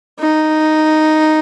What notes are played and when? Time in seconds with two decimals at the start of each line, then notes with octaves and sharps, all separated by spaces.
0.20 D#4